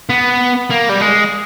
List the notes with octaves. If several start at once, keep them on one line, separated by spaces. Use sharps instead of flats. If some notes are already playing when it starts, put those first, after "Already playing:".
B3
A#3
G3
G#3